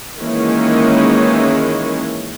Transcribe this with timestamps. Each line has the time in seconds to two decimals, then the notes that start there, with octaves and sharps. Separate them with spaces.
0.21 D#3 E3 G#3 A#3 C#4 E4